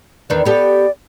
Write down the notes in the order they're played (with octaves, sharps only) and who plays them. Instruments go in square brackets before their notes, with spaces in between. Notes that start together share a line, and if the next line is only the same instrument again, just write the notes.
[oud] E2 D#3 D4 [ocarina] B4
[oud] B3 G4 A4 [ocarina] D5